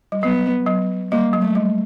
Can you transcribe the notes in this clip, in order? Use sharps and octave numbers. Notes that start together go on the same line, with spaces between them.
G3
F#3 B3
F#3
G3 A#3
F#3
A3
G3